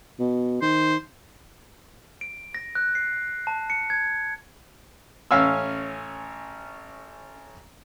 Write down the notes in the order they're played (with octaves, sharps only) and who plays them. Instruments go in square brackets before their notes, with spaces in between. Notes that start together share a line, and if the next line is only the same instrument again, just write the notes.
[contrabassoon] B2
[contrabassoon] D#3 [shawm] C5
[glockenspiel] D7
A#6
F#6
C7
A5
C#7
G#6
[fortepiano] A1 C#4 F5 G#5 E6